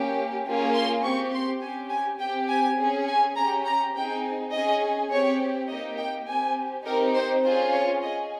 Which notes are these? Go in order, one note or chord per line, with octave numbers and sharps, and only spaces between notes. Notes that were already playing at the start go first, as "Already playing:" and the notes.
Already playing: A#3 C#4 G4
A#3 C#4 F4 G#4
C6
C4 G4 C#6
C6
C#4 G4 G#5
G#5
C4 G4 G5
G#5
C#4 G#4
G#5
C#4 G4 A#5
A#5
C4 D#4 G#4 G5
C#4 G#4 D#5
C4 G4 C#5
A#3 D#4 G4 D#5
G5
C4 G4 G#5
C4 D#4 G4 A#4
C5
C#4 F4 G#4 C5
C#5
C#4 G#4 D#5